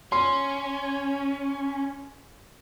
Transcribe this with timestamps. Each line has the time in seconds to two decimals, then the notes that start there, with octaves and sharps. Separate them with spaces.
0.12 C#4 C6